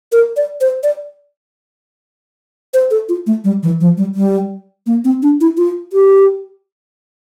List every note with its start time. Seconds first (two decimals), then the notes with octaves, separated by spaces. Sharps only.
0.12 A#4
0.37 D5
0.61 C5
0.83 D5
2.74 C5
2.91 A4
3.09 F4
3.27 A3
3.44 G3
3.63 E3
3.81 F3
3.97 G3
4.15 G3
4.87 A#3
5.04 C4
5.22 D4
5.41 E4
5.57 F4
5.93 G4